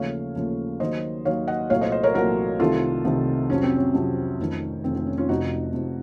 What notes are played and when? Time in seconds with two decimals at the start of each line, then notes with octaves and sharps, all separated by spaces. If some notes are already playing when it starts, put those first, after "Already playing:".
Already playing: D#2 C#3 F3 A3 C#5 F5
0.36 D#2 C#3 F3 A3
0.80 D#2 D#3 F#3 C5 D#5
1.25 D#2 D#3 F#3 C#5 F5
1.48 D#5 F#5
1.70 C2 A#2 F#3 A3 C#5 F5
1.81 C5 D#5
1.92 C5 D#5
2.03 A#4 C#5
2.14 C2 A#2 F#3 A3 F#4 A#4
2.60 C2 C3 D#3 A3 F4 A4
3.05 C2 C3 D#3 A3
3.50 F2 C3 F#3 C#4
3.63 C4
3.76 C#4
3.94 F2 C3 F#3
4.39 F1 F2 D#3
4.84 F1 F2 D#3 C4
4.96 C4
5.07 C#4
5.18 C#4 F4
5.29 F1 F2 C3 D#4 F#4
5.74 F1 F2 C3